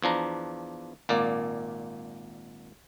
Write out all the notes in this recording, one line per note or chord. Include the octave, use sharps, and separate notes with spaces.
E2 F3 D4 A#5
G#1 A#2 A#3 D5